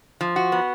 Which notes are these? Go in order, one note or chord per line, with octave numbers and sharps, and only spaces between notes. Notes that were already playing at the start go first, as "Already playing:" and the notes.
F3
F#4
B3